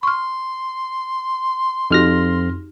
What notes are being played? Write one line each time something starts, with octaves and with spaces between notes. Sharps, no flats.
C6 C#6 F6
F2 D#4 F#4 G4 F6 A#6